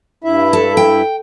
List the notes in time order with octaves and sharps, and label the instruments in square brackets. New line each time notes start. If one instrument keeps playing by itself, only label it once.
[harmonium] G2 E4 E5
[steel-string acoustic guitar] A4
G5